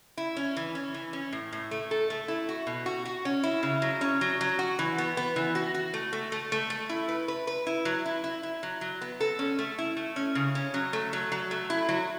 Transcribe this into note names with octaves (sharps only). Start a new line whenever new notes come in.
E4
C#4
E3
C#4
E3
C#4
A2
A2
A3
A4
A3
E4
F#4
B2
F#4
F#4
C#4
E4
C#3
F#3
C#4
F#3
F#3
F#4
E3
B3
B3
E3
F#4
F#4
A3
A3
A3
A3
A3
E4
B4
B4
B4
E4
F#3
E4
E4
E4
F#3
F#3
B3
A4
C#4
A3
E4
A3
C#4
C#3
C#4
F#3
A3
F#3
F#3
A3
E4
F#3